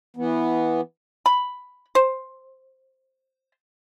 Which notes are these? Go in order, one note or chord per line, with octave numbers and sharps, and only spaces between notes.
E3 B3
B5
C5